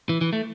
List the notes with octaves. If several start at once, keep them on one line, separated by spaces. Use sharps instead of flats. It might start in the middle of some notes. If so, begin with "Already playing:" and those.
E3
E3
A3